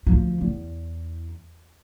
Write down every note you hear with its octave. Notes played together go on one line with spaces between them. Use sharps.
D2 F3
E2